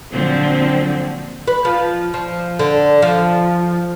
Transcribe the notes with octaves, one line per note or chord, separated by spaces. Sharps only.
A#2 D3 F3 F#3 C4
B4
F3
F3
D3
F3